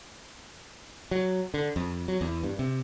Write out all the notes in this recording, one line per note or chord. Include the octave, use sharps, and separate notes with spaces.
F#3
D3
F2
F#3
E2
G2
C3